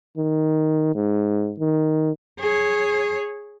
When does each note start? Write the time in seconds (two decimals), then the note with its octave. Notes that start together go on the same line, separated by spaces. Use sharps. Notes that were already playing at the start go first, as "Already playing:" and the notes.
0.17 D#3
0.95 G#2
1.59 D#3
2.40 G#4 C#5